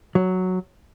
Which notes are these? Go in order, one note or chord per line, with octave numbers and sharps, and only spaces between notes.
F#3